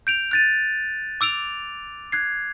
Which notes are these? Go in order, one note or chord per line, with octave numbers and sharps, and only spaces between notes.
G6 D7 F7
F#6 A6 D#7
D6 E6 D7 F7
F#6 G#6 C7